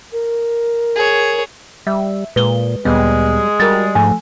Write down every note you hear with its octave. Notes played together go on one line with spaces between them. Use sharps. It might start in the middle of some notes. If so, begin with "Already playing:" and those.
A#4
G#4 C#5
G3 E5
A#2 G#3 B4 G7
D2 A#2 G3 G#3 B3
G3 F#4 A#4 A6
G#2 F3 A3 G#5